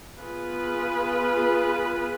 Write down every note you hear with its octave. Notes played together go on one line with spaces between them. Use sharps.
B3 F4 G#4 B4